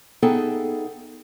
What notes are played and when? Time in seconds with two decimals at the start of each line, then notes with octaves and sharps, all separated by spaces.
0.22 B3 D#4 G#4 A4 E5 G5